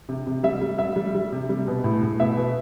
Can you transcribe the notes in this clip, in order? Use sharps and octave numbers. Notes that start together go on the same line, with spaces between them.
C3
C3
G3 E5
G3
G3 E5
G3
G3
C3
G3
B2
A2
A2
B2 E5
B2